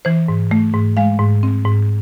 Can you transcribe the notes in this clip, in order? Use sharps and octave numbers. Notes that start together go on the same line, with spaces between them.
E3 C5
G#2
A3
G#2
G#3 F5
G#2
C4
G#2